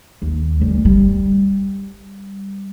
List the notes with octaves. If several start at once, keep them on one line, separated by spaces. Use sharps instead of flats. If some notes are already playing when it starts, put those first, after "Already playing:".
D#2
D2 G3
G3